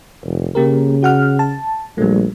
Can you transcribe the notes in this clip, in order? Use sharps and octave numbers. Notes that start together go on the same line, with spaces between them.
F1
C#3 A#3 G4 A#4
F#4 F#5 F6
A5
A#1 G3 A3